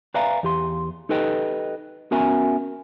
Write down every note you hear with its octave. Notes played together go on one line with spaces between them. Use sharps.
B4 D5 E5 F5 G#5 A#5
E2 G4 C6
D#4 G4 A4 B4 D#5 G5
B3 C#4 F#4 A#4 E5 G#5